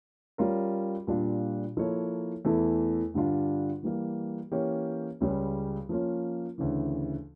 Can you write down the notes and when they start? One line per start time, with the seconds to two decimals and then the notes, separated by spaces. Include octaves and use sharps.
0.38 G3 C#4 F4 A#4
1.07 A#2 G3 D4 F4
1.77 F3 A#3 E4 A4 C#5
2.45 E2 E3 A3 E4 A4
3.14 G2 D3 G3 D4 F4
3.83 E3 G3 A#3
4.51 E3 A#3 C#4 G4 C#5
5.21 C#2 C#3 G3 C#4
5.89 F3 A#3 C#4 F4
6.58 D2 C#3 E3